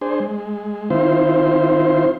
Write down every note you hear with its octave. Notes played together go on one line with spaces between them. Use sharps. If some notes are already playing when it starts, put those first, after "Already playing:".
D4 G#4 C5
G#3
D#3 C4 E4 F4 C5